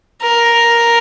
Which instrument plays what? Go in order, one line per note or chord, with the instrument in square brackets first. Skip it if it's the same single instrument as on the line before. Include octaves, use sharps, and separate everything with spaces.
[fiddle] A#4